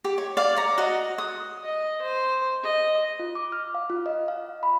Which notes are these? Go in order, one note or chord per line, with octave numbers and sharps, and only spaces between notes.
G4
C#5
D5 F5
C#5 A#5
F#4 D#5
D#6
D#5
C5
D#5
F4
D6
F6
F5
F4
D#5
F5
B5